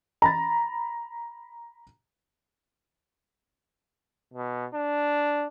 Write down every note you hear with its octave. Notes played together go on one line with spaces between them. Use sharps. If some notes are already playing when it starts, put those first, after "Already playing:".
A#5 B5 A6
B2
D4